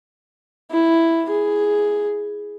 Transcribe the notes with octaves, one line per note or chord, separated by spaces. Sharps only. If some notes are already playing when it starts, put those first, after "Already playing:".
E4
G#4